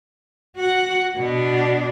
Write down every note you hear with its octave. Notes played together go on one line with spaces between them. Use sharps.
F#4 F#5
B2 D4